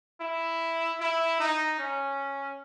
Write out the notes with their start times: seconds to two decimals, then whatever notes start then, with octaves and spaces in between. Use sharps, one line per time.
0.21 E4
1.00 E4
1.40 D#4
1.79 C#4